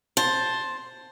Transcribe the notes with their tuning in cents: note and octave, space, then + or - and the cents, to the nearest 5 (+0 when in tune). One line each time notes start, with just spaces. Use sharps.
C5 +10 A5 +0